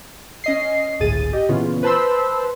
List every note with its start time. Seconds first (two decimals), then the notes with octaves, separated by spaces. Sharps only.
0.44 C#4 D#5 C7
1.00 G1 C#2 A2 G#4 A6 D#7
1.33 G4 D#5
1.49 A#2 C#3 E3 B3 C#4 F4
1.83 B4 C5 A5 B5 C6 E6